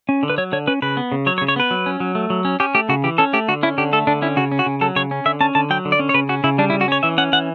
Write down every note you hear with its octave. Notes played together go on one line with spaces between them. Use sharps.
C#4
D3
B4
F#3 C#5
D3 C#5
C#4 B4
C#3 B4
B3
C#3
F#3 C#5
C#5
C#3
C#5
B3 B4
F#3
C#4
F#3
A3
F#3
C#4
C#4 G4
A3 G4
C#3 F#4
E3 G4
C#4 A4
A3 G4
D3 F#4
C#4 E4
D3 G4
A3 A4
D3 D4
C#4 E4
C#3 F#4
C#4
F#4
C#3
F#3 A4
C#3 C#5
C#4
D3 E5
C#4 A5
D3 A5
F#3 G5
D3
D5
C#4
C#5
C#3 B4
C#4 F#4
C#3 E4
G3 D4
E4
C#3
F#4
C#4 C#5
E3 E5
C#4 F#5
E3 F#5